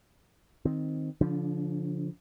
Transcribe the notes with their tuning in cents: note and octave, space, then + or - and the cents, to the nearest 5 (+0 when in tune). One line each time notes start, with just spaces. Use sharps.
D#3 +0 C4 +0
D3 -45 F3 +0 D4 +0